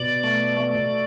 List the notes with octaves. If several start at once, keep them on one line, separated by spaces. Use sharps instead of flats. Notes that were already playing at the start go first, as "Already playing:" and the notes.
Already playing: B2 D5
A3
A3